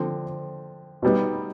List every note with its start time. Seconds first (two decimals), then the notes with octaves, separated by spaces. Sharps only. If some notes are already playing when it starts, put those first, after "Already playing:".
Already playing: D3 F3 C4
1.02 B2 G3 B3 D#4